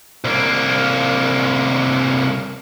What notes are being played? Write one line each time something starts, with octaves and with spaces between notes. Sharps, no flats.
C2 A#3